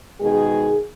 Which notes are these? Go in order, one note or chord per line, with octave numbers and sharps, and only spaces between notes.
B2 D#3 G#3 G#4